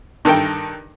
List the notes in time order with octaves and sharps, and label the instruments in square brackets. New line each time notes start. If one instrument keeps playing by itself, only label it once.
[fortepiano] G2 D#3 A4 A#4 G5